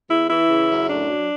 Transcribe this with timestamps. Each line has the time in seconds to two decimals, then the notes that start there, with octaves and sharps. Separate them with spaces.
0.09 E2 E4
0.29 E3 E4
0.50 C#3
0.70 F#2
0.89 A2 D4
1.10 F#3